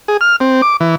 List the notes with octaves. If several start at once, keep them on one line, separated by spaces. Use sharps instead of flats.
G#4
F6
C4
D6
E3